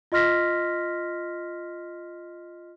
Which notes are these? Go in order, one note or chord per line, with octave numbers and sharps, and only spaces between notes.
F4 D#5 C6 F6 A#6 B6